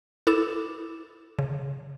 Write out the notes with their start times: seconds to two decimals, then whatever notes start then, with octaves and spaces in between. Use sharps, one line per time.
0.27 E4 A4 D6 E7
1.39 C#3